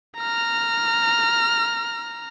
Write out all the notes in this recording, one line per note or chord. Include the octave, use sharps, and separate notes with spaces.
A#5 F6